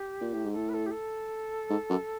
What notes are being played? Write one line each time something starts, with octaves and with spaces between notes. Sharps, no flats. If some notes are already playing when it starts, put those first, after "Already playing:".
Already playing: G4
A#2
A2
G#2
A2 A4
B4
A4
G4
A4
G#2
F#2